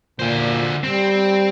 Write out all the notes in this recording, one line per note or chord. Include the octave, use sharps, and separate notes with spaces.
A#2 D3 C5
G3 C4